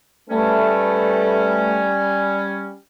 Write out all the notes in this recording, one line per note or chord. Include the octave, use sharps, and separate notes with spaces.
G3 A3 C#4 B4